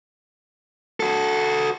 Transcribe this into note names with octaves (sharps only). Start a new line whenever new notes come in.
F#4 A4